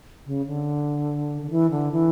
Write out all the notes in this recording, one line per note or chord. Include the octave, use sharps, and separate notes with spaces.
C#3
D3
D3
E3
D3
E3